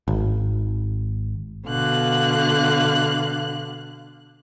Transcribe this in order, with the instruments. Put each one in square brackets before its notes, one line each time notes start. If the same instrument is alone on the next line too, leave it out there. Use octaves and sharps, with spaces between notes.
[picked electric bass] G#1
[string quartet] B2 D3 F5 F#6